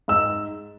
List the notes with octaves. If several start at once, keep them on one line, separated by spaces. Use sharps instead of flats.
G#2 E6